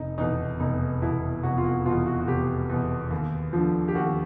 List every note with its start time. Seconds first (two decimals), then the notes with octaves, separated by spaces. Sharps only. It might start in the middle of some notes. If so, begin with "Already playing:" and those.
Already playing: F1 D#4
0.18 E2 B2 D#4
0.60 F1 D#4
1.02 E2 B2 E4
1.43 F1 F#4
1.58 F4
1.64 F#4
1.86 E2 B2 F4
2.06 F#4
2.21 F#4
2.27 F1 G4
2.70 E2 B2
3.11 D#2
3.53 D3 F3
3.88 G4
3.95 D#2 F#4